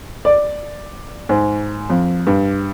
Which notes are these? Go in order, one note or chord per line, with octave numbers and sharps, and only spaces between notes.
D5
G#2
F2
G2